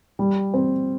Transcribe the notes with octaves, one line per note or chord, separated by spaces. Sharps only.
G3
C4